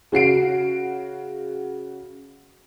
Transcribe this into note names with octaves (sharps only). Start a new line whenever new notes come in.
C#3 F#4 C7 D7